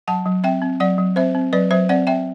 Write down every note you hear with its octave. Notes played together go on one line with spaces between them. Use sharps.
F#3 F#5 A5
F#3
C4 E5 G5
C4
F#3 D5 F#5
F#3
C4 C5 E5
C4
F#3 B4 D5
F#3 C5 E5
C4 D5 F#5
C4 E5 G5